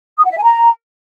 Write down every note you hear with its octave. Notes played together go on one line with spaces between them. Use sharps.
D#6
F#5
E5
G#5
A#5